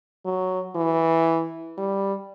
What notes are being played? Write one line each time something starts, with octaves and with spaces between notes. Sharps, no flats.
F#3
E3
G3